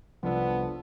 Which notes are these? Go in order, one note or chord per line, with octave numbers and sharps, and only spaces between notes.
C2 F3 B3 D4 A4